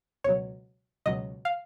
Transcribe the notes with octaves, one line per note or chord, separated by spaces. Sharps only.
C#2 B2 F#3 C#5
C#2 B2 F#3 D#5
F5